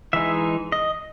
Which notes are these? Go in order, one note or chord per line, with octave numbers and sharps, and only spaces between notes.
E3 G#3 D#4 E5
D#5